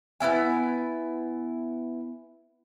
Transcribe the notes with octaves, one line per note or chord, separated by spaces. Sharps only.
B3 C#4 E4 G#5